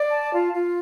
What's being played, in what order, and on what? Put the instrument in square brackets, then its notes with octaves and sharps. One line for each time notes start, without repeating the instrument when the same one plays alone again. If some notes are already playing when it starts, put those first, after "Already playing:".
Already playing: [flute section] D5
A5
F4
F4